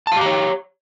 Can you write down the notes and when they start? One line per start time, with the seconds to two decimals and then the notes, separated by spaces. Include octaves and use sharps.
0.07 A5
0.12 F5
0.16 G4
0.21 A#5
0.26 C#5